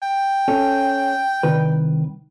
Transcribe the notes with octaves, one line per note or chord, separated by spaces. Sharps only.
G5
C#4 A4
C2 D#3 B4